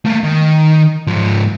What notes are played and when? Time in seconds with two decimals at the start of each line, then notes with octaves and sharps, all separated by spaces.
0.05 A3 A#3
0.23 D#3
1.07 G#2 F3